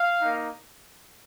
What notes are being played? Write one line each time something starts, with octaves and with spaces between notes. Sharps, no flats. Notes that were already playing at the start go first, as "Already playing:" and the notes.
Already playing: F5
A#3 D#4